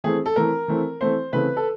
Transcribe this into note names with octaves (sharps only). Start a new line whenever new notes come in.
E3 A3 C4 G#4
A4
E3 A3 C4 A#4
E3 A3 C4
E3 A3 C4 C5
C#3 E3 A3 C4 B4
A4